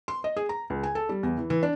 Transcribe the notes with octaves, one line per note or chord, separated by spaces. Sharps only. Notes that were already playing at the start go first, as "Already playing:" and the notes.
C6
D#5
G#4
A#5
C#2
G#5
A4
G3
E2
E3
E3
D4